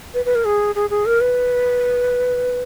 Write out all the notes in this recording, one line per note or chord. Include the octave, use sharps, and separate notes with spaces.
B4
B4
A#4
G#4
G#4
G#4
A#4
B4